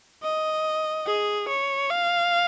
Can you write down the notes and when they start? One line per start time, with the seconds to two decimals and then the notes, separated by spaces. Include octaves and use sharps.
0.23 D#5
1.06 G#4
1.49 C#5
1.90 F5